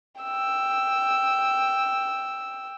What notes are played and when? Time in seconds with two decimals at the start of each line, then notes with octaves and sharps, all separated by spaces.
0.22 G5 E6